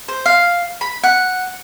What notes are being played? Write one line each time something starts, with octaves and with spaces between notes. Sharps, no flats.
C5
F5
B5
F#5